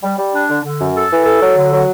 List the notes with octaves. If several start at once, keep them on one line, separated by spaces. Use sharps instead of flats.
G3
G3
D4
D3
D3
F#2
A4
E3
A4
F#3
D3
F#3